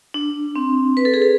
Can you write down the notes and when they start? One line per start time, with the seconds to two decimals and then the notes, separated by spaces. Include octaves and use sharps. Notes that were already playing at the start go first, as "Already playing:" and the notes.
0.14 D4
0.56 C4
0.97 B4
1.05 A4
1.14 G#4
1.22 A4